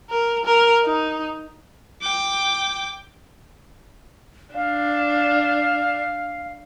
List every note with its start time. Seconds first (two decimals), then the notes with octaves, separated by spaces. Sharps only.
0.10 A#4
0.45 A#4
0.85 D#4
2.02 G5 D6
4.55 D4 F5